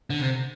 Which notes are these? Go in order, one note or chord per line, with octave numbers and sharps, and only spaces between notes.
D3
C3